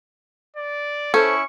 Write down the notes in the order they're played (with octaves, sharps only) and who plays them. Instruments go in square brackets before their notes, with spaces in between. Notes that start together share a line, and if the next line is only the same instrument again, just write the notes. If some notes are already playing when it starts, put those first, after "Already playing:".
[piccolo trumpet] D5
[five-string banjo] C#4 [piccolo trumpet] E4 [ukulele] A4 C5 [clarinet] C#6